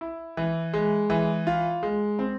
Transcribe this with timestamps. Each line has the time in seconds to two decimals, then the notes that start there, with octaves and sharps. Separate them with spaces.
0.01 E4
0.37 E3
0.73 G#3
1.10 E3
1.47 F4
1.83 G#3
2.19 C4